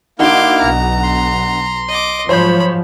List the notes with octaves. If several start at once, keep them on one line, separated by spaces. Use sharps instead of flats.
D3 A#3 D#4 E4 F#4 C6 D6 F6
B1 A#5
C6
D#5 D6
G#2 F3 F#3 C5 C#5 B5 G6